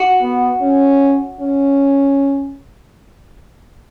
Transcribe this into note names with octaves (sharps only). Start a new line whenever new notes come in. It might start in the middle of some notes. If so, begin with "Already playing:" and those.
Already playing: F#4
B3
C#4
C#4